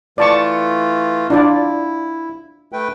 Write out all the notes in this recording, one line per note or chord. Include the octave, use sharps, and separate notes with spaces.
E3 A3 F4 D5 A5 C#6
D4 E4 F4 D5
A3 B4 G5